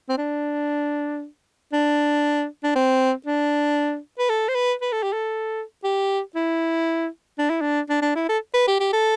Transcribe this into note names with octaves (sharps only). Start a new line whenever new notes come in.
C4
D4
D4
D4
C4
D4
B4
A4
C5
B4
B4
A4
G4
A4
G4
E4
D4
E4
D4
D4
D4
E4
A4
B4
G4
G4
A4